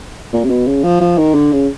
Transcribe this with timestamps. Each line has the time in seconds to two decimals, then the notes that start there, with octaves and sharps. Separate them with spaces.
0.33 A#2
0.44 C3
0.50 B2
0.67 C#3
0.84 F3
1.01 F3
1.18 D#3
1.34 D3
1.52 C#3